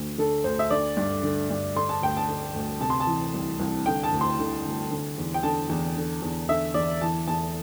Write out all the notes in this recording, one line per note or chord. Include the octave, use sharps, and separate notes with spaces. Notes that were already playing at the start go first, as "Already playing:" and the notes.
Already playing: D2 D3
D3 A4
D2 C5
E5
D3 D5
G2
D3
G2
D3 C6
A5
D2 G5
A5
D3
D2
C3 A5
C6
A5
E3
C2
C2
D3 G5
A5
D2
C6
D3
D2
D3
E2
G5
D3 A5
E2
D3
E2
D3 E5
E2 D5
E3 A5
E2 A5